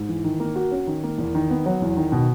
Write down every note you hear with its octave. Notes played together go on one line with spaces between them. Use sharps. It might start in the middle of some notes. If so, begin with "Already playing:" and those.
Already playing: G#2
E3
D#3
A#3
F#4
C#4
D#3
A#3
E2
D#3
B3
F#3
E2
D#3
B2